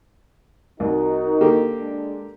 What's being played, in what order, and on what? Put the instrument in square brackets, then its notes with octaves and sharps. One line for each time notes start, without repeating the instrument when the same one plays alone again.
[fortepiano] C2 [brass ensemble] D#4 F#4 A#4
[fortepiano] D3 A#3 G4
[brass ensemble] G#3 D4